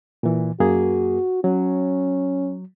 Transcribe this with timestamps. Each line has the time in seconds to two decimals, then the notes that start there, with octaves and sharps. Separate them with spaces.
0.23 A#2 E3
0.60 F#2 A#3 F#4 G#4
1.44 F#3 C#4